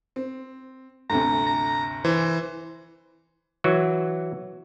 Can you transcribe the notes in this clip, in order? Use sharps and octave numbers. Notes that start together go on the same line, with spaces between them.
C4
G1 D2 C3 A#5
A#5
E3 C5
E3 F#3 F#4